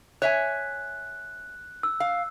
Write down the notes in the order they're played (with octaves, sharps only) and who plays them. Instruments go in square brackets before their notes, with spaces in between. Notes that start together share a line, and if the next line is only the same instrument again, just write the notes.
[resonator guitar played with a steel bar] C#5 E5 G#5 [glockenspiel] F#6
[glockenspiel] E6
[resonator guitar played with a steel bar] F5